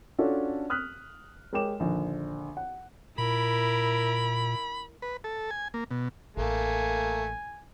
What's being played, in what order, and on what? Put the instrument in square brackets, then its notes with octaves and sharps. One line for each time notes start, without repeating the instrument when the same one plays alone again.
[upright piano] C#4 D4 F4 F#4 A4
D#6 F6 F#6 B6
G#3 A#4 C#5 G5 D6 E7
A#1 D3 D#3
F#5
[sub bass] A#2 [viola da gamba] E4 A#4 [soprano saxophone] B5
[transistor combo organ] B4
A4
G#5
A#3
B2
[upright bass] A1 [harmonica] A3 A#3 [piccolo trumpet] G#5